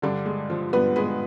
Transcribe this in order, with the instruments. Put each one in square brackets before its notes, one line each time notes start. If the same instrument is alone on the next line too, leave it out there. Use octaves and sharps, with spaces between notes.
[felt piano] G2 D3 D4
G#3
F3
G2 B3 B4
G#3 B3 B4